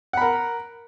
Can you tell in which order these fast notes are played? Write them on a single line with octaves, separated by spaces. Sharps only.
F#5 B5 A#4